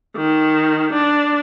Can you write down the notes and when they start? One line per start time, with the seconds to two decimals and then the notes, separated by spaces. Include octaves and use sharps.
0.16 D#3
0.93 D4